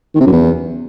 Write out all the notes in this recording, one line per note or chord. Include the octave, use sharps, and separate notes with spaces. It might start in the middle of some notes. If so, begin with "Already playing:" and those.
D#3
C3
F#2
E2